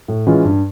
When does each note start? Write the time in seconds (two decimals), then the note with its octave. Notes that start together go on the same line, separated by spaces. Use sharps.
0.08 A2
0.27 E3 G#3 C#4 F4
0.44 G2